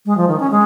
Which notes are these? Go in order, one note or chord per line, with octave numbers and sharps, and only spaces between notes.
G#3
F3
D#3
C#4
G#3